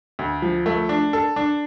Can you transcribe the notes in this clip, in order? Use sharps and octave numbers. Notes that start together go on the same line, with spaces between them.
D2
F3
A3
D4
A4
D4